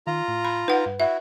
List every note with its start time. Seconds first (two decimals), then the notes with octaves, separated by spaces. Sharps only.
0.07 D#3 F4 A#5
0.28 A2
0.45 B5
0.68 D#4 B4 F#5
0.86 G2
1.00 E4 F#4 E5